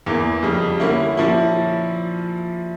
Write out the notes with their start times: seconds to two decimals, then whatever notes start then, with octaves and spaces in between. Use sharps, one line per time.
0.06 E2 E3 A#3
0.43 F2 C#3 G3
0.80 D3 G3 A#3 C#4 E4
1.17 A#2 F3 C#4 E4